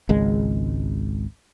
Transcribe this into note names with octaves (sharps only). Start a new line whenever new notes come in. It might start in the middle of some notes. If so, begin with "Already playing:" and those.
G#1 C#2 G#3